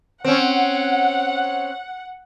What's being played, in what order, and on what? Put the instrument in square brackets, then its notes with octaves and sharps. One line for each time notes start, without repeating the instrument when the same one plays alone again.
[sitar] C4 C#4 [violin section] F#5